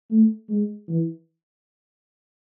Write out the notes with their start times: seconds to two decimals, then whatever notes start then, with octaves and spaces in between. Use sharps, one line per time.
0.11 A3
0.49 G#3
0.88 E3